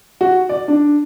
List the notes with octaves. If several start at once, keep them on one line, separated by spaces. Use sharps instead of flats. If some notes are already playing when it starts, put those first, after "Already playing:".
F#4
D5
D4